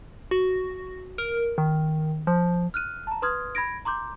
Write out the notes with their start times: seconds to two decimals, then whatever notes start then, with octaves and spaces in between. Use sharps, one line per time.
0.31 F#4
1.18 A#4
1.58 D#3
2.27 F3
2.74 F6 F#6 D#7
3.07 A5 A#5
3.22 B4 C6 D#6 F6 G#6
3.55 B5 G#6 A#6 D7
3.85 A#5 C6 D6 G6